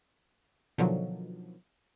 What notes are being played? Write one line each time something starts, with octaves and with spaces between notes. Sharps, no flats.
B2 D3 D#3 F3 F#3